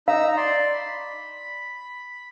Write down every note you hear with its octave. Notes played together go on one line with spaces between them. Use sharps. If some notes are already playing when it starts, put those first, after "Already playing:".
D#4 F5 A#5 E6
D5 C6
B5